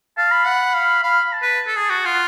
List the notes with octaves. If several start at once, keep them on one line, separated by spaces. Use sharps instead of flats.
F5 A5
B5
F#5
F5
F5 B5
A5
B4
A4
G#4 A5
F#4 A5
F4 F#5